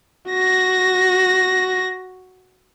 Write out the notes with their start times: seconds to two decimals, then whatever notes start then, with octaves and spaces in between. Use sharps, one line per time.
0.29 F#4 A#6